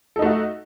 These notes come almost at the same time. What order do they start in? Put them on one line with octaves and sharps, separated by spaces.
A4 D#4 A3 F#4